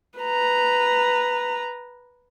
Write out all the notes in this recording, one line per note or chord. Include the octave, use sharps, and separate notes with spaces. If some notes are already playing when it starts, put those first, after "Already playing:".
B4 A#5